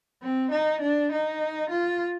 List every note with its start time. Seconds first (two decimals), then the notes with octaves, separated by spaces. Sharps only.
0.22 C4
0.52 D#4
0.81 D4
1.12 D#4
1.70 F4